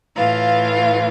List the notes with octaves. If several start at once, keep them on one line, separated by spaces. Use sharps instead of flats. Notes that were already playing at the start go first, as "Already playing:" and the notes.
A2 E3 F4 F5